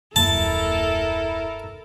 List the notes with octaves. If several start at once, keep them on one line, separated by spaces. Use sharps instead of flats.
D#1 F#2 A#3 E4 A4 A#4 A5